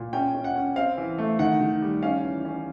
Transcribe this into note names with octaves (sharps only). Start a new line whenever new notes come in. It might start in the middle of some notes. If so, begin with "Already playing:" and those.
Already playing: A#2
C#4 G5
C#4
F#5
C#4
C4 F5
E3
A3
D#3 F#5
D#3
G3
C#4 F5
E3
C#4